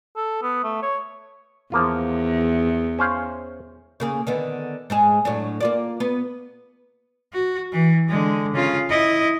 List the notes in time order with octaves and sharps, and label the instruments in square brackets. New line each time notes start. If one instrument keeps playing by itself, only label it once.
[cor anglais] A4
B3
A3
C#5
[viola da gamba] E2 [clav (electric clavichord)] F3 A#3 F4
[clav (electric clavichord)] C#4 C5 F5
[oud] C#3 A#3 G#4
D3 D#3 B3
G#2 G#3 G#4
A2 F#3 D4
A#3 F4 D5
B3
[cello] F#4
E3
D3 G#3
C#3 F4
E4 D#5